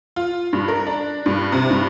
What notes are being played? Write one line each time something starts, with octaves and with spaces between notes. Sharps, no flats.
F4
G2
A#4
D4
G2
C3
G2